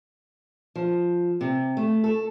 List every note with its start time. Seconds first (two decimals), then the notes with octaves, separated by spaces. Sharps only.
0.76 F3
1.41 C3
1.77 A3
2.04 A4